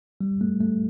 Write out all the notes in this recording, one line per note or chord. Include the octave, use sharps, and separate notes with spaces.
G3
A3
A3